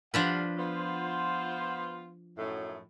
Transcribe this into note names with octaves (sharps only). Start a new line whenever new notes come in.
G2 F3 D4 B4 F5 F#5
B3 F4 C5
F#2 A2 D#4